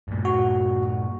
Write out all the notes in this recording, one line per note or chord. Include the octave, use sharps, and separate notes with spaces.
G2 A#2
F#4